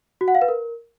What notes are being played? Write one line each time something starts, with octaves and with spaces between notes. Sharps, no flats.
F#4
F#5
F5
B4
A#4